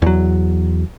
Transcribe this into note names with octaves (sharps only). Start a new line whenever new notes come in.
E2 F#3